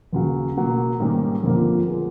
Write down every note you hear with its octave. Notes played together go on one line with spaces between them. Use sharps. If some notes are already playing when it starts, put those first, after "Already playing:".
D#2 C#3 F#3
B2 F#3 A#3
G#2 D#3 G3 A#3 C#4
G1 F2 D3 F3 A#3
F3 G#3 B3